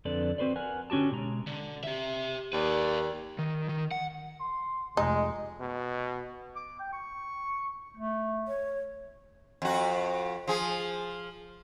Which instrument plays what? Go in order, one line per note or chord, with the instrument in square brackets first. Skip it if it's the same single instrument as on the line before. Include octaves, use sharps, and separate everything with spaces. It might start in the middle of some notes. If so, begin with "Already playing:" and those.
[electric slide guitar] F2 D3 C4 A4 B4 D5
C4 F#4 B4 C5 D5
A#4 B4 F#5 G#5
D3 C#4 F#4 G4 A5
B2 G#3 A#5
[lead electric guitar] D3
G4 E5
[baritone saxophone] D#2 [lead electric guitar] B4 D5
[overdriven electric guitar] D#3
D#3
F#5
[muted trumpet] C6
[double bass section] F1 [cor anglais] G#3 [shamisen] D#4 [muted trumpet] G#4
[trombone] B2
[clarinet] D6
G5
C#6
A3
[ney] C#5
[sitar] F2 F#4
F3 G#4